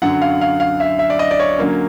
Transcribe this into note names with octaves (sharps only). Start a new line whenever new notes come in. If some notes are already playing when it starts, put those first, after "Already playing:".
F#2 D3 F#3 F#5
F5
F5
F5
E5
E5
D5
D#5
D5
C#5
D3 F#3 A#3 C#4